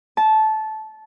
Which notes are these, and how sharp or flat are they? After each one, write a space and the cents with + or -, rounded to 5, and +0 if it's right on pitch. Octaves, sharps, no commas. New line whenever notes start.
A5 -15